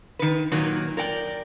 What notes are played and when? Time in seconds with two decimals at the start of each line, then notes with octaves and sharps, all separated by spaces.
0.19 D#3 B4
0.52 A#2 D#3 F#3
0.97 A#4 D5 G5